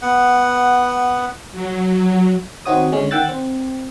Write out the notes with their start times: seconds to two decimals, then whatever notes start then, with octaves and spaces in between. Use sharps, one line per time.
0.02 B3 F#5
1.52 F#3
2.65 D#3 C4 D#4 F#4 C#5 D#6
2.92 D3 G#3 C#4
3.11 D#3 F#5 G5 E6 F#6 A6
3.29 C4